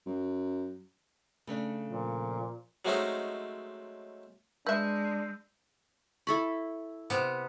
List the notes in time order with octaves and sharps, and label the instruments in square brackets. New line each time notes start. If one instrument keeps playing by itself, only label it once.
[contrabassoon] F#2
[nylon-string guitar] C#3 A3 D4
[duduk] A#2 [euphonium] F3
[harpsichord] F#3 G#3 A3 C4 C#4 D#4
[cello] G#3 [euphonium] D4 [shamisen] B4 E5 [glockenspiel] E6 G6
[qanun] E4 A4 B5 [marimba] C#6
[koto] C3 B3